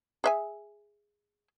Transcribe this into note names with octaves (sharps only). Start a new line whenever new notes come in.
G#4 E5 G#5